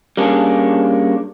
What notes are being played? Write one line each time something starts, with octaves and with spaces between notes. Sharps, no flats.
G3 A#3 C#4 D4 G#4